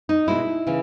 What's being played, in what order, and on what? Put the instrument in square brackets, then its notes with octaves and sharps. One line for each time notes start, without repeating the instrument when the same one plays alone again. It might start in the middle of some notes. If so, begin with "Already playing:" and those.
[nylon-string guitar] D#4
B2 G#3 E4
C#3 E3